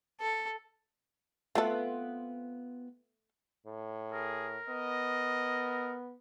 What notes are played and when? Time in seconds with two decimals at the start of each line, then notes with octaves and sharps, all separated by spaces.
0.21 A4
1.55 A3 B3 C4 F4 A4
3.66 A2
4.12 G#4 A#4
4.68 B3 D#5